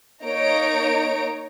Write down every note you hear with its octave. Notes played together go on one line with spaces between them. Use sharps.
A#3 D#4 C#5 A#5 D7